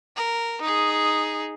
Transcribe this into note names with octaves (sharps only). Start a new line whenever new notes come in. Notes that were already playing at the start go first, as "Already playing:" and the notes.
A#4
D#4 G#4